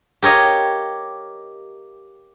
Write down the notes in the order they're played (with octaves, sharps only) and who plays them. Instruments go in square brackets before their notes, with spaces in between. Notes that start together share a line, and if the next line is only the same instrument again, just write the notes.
[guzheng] G4 A#4 C#5 D#5 F5